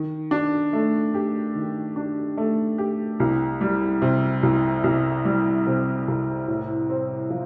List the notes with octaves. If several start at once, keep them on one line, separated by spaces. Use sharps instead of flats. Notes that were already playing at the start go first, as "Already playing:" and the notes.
Already playing: D#3
D4
A3
G4
D#3
D4
A3
G4
C2
G3
C3
C2
C2
G3
C3
C2
A2
C4
F3